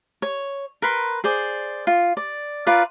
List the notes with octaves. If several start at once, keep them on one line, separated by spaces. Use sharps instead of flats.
C#5
A#4 B4 B5 C6
G#4 C5 D5
F4
D5
F4 A#4 B4 D5